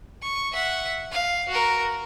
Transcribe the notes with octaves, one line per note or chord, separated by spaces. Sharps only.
C#6
E5 F#5
F5
F#4 A#4